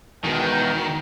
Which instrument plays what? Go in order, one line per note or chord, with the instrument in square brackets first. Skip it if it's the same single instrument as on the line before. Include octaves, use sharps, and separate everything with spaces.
[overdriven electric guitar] E2 G#3 [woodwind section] B2 A#4 G5 [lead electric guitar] D#3